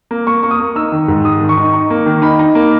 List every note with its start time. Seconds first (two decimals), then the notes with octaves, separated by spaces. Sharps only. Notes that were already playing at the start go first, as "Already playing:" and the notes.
0.11 A#3
0.27 A#3 C#6
0.43 A#3 C#6
0.51 D#6
0.60 A#3
0.76 D#4 E6
0.92 D#3
1.08 G#2
1.25 D#3 D#6
1.40 D#3
1.49 C#6
1.57 D#4
1.74 D#4
1.90 A#3
2.06 D#3
2.22 D#4 B5
2.39 D#4
2.55 A#3